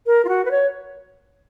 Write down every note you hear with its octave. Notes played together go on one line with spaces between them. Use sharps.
A#4
F4
F#4
B4
C#5